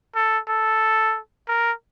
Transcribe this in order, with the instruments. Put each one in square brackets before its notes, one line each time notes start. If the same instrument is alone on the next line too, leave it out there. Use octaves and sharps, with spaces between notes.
[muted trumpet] A4
A4
A#4